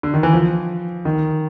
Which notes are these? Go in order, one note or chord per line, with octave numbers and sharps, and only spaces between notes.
D3
D#3
E3
F3
D#3